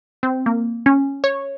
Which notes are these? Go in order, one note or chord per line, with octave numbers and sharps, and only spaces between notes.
C4
A#3
C#4
C#5